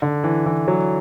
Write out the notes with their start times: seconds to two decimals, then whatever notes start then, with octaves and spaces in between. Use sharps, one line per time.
0.02 D3
0.24 E3
0.46 E3
0.68 F#3